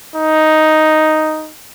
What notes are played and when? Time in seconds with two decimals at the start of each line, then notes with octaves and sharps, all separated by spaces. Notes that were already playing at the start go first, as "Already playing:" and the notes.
0.16 D#4